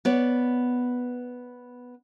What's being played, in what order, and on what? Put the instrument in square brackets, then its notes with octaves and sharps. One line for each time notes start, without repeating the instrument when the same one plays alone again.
[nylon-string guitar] B3 C#5 D5